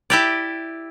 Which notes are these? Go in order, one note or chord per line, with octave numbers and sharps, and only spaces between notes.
E4 G4 D5